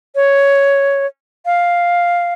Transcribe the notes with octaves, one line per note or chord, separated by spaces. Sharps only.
C#5
F5